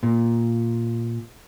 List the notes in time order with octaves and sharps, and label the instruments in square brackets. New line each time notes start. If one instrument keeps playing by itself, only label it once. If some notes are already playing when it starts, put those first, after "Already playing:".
[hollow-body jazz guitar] A#2